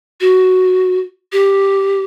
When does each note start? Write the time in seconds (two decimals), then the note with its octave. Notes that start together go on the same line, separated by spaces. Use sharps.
0.21 F#4
1.33 G4